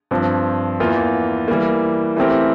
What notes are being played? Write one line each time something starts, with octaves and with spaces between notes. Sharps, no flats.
G2 F3 C4
E2 E3 A#3 F4
E3 G3 A#3
E3 A3 C4 G4 A#4